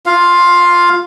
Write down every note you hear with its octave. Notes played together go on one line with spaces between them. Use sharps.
F4 F5